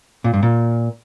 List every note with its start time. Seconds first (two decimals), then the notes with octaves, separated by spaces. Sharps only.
0.24 A#2
0.34 G2
0.43 A#2